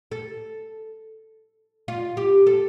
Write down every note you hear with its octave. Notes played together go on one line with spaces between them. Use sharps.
A4
F4
G4
A4